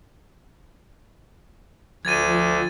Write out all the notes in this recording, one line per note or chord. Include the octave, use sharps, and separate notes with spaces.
D2 F3 G#6 A6 D#7